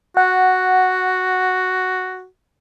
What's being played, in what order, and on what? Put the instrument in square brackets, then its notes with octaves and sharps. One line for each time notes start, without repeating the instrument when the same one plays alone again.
[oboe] F#4 [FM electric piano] F#5